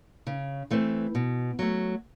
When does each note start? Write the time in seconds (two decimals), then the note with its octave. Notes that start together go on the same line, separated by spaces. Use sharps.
0.27 C#3
0.71 E3 A3 C4
1.15 B2
1.59 F#3 A3